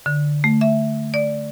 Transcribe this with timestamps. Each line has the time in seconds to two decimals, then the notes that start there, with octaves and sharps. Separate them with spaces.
0.06 D3
0.44 A3
0.61 E5
1.14 D5